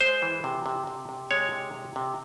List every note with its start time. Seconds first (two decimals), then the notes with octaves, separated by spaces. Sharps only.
0.01 G#3 C5
0.22 E3
0.44 C3
0.66 C3
0.87 C3
1.09 C3
1.31 G#3 C#5
1.52 C3
1.74 C3
1.96 C3